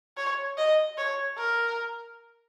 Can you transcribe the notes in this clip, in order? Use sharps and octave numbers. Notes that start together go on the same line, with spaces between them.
C#5
D#5
C#5
A#4